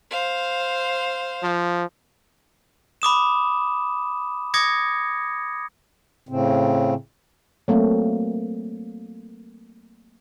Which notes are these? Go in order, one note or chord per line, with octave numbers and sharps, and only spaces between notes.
C5 F5
F3
B5 D6 D#6 E7
D6 D#6 G#6 A#6 C#7
A2 C#3 C4
F#3 A3 A#3 C4